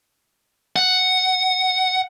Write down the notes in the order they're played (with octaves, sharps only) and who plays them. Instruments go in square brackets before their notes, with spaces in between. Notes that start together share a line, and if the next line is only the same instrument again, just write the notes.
[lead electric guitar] F#5